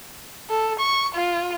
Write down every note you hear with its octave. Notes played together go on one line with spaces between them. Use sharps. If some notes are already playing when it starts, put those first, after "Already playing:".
A4
C#6
F4